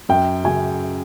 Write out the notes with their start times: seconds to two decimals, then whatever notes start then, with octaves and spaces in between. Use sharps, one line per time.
0.09 F#2 G5
0.44 C#3 F#3 G#5